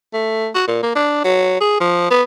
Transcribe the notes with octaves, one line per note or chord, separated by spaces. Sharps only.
A3
F#4
A#2
A#3
D4
F#3
G#4
F3
B3